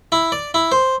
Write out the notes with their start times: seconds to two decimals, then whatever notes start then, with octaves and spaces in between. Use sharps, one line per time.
0.12 E4
0.32 D5
0.54 E4
0.72 C5